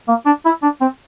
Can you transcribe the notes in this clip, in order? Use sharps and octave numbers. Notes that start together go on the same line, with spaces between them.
A#3
D4
E4
D4
C4